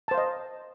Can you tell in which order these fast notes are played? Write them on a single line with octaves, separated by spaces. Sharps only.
A5 C5 F5 D#5